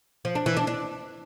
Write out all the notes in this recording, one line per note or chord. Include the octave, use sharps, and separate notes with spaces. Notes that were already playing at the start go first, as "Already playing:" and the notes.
F3
D4
E3
D4
D4